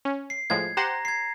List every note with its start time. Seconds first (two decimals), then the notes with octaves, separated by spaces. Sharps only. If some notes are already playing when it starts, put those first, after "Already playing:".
0.05 C#4
0.30 C7
0.50 A2 F3 G#3 G#6
0.77 G4 C5 F#5 A#5 A#6
1.05 G#6 C7